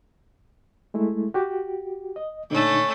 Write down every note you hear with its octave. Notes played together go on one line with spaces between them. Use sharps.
G#3 A3 E4
F#4 G4
D#5
A#2 D3 A3 C#4 D#4